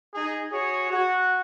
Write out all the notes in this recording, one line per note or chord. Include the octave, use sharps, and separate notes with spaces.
D#4 G#4
F#4 G#4 C#5
F#4